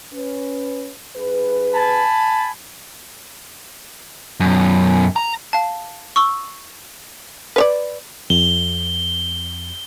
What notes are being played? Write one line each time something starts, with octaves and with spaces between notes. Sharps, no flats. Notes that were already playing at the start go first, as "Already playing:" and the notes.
C#4 B4
G2 G#4 B4
G#5 A5 B5
F#2 B2
A#5
F5 A5
C#6 E6 G7
B4 C#5 D5
F2 G7